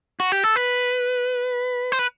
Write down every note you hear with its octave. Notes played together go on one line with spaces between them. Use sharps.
F#4
G4
A4
B4
C5
B4